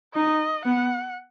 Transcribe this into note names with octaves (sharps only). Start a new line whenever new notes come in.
D#4 D#5
B3 F#5